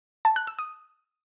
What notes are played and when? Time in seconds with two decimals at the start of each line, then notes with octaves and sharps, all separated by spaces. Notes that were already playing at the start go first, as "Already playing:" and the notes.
0.25 A5
0.36 F#6
0.47 E6
0.59 D#6